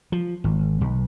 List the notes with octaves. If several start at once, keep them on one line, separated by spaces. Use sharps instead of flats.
F3
G#1
B1